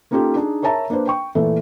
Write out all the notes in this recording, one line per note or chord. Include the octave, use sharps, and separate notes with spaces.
A#3 C#4 D#4 F4 G4 A4
D4 D#4 G#4
A#4 C#5 E5 A5 A#5
A#3 D4 B4 C5
G5 C#6
A#2 E3 A3 A4 B4 E5